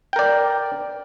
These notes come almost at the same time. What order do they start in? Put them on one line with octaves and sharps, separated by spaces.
G5 A#4 D5